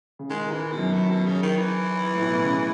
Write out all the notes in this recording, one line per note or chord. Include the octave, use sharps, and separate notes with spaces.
C#3
D#3 G#3
D#3
E3
B2
F#2
A2
B2
C#3
D#3
E3
A2
B2
C#3